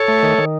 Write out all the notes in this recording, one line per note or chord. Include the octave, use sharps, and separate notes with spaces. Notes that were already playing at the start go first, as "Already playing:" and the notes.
Already playing: A4 C#5
A3
D#3
D#3